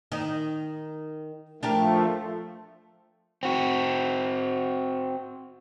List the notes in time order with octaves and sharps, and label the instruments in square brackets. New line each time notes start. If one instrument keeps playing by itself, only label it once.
[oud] D#3 D#4
[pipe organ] F3 A3 [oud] D4 G4 A#4
[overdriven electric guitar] C4 F#4